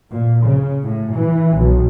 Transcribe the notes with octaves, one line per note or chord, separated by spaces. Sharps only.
A#2
C#3
A2
E3
B1